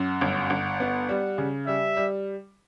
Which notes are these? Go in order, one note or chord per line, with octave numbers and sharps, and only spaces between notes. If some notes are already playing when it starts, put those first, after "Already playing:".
Already playing: F#2 F#5
G1
G1
B3
G3
C#3
G3 E5
G3